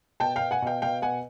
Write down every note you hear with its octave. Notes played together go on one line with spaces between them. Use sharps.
B2 G5 A5
B2 F5 G5
F#5 G#5
B2 F5 G5
B2 F5 G5
B2 F#5 G#5